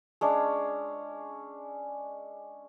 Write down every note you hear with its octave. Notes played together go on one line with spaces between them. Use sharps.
G#3 C#4 D4